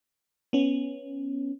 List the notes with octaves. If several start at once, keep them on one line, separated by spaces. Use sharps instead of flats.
B3 C#4